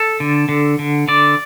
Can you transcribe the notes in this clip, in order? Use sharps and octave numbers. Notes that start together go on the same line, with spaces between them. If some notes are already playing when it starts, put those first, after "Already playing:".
Already playing: A4
D3
D3
D3
D3 D5